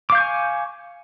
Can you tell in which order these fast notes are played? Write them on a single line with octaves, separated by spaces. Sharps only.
D6 F5 G6 C#6 G#5